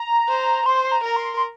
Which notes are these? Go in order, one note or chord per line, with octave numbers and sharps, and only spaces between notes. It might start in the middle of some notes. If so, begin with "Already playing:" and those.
Already playing: A#5
C5
C5 C6
A#5
A#4
C6
C6